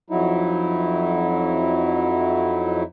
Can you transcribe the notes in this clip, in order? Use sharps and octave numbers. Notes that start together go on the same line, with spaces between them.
F2 F#3 D#4 E4